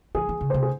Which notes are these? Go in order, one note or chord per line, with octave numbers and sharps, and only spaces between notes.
E3 G#4
E3
C#3
C3 C5
G#4